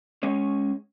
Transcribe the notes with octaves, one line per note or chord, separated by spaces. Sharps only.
G#3 C#4 C#5